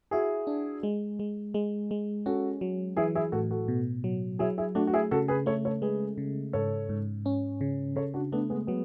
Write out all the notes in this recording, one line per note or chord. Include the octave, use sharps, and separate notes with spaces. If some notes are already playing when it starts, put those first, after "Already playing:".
E4 F#4 G#4
D4
G#3
G#3
G#3
G#3
C#4 F#4 A4
F#3
E3 E4 G#4
E4 G#4
A2 F#4 A4
F#4 A4
B2
F#3
F#3 E4 G#4
E4 G#4
A3 D4 F#4
F#4
E4 G#4
C#3 F#4 A4
G#4 B4
A3 A4 C#5
A4 C#5
G#3 G#4 B4
C#3
G#2 A4 C#5
G#2
C#4
C#3
C#3 A4 C#5
D4 F#4
A3 B3 D4
G#3 B3
F#3 G#3 B3